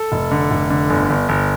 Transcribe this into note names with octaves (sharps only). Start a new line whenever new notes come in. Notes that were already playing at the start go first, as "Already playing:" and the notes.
Already playing: A4
F1
D3
F1
D3
G1
G1
G1